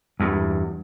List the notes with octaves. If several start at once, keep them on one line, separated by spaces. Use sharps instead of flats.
E2 G2